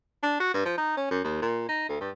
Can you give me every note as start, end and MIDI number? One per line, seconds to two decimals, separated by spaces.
0.23 0.37 62
0.40 0.52 66
0.54 0.63 43
0.65 0.75 53
0.78 0.94 63
0.97 1.09 61
1.11 1.21 42
1.24 1.39 39
1.42 1.64 46
1.68 1.86 63
1.89 1.96 38
2.00 2.10 43